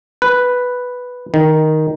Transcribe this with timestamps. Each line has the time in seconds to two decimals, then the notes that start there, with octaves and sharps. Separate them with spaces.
0.22 B4
1.34 D#3